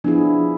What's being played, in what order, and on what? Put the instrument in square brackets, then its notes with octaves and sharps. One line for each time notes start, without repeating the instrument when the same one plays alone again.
[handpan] F3 B3 E4 G#4 [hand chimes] D4